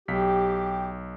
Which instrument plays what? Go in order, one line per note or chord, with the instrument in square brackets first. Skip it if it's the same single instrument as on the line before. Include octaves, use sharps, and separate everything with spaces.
[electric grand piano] B1 B6 [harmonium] G4